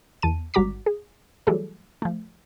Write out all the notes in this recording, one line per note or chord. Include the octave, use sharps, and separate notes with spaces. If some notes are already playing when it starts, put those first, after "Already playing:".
E2 A5 D#7
G#1 G3 F#4 A#5 D6 B6
G#4
E3 F#3 G3 A3 G#4 A4
F3 A3